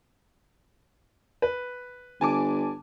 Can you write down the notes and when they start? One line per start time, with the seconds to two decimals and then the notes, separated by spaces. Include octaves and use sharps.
1.42 B4
2.21 G1 G#5 A5 D6